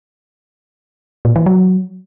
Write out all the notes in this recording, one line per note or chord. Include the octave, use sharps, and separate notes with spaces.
A#2
E3
F#3